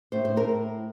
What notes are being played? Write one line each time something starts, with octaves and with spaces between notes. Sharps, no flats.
A2 C5
C5
A2 A#4